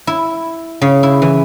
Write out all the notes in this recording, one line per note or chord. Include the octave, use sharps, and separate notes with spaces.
E4
C#3
E4
E3